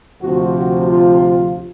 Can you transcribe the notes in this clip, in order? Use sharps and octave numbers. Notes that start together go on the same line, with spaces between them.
D2 C3 F3 F#4
F#4
F4